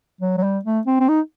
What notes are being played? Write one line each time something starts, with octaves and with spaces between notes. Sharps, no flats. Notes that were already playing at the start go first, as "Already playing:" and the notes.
F#3
F#3
G3
A3
C4
C4
D#4